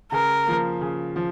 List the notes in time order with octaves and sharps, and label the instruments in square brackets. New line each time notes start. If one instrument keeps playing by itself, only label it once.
[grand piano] C#3 [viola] A#4
[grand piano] F3 A#3
C#3
F3